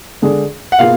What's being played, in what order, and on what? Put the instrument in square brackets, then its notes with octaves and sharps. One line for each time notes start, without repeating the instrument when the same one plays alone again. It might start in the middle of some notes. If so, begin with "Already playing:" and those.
[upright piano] D3 G#3 D4 G#4
[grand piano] F#5
[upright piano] B2 A#3 F4 G#4 [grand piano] F5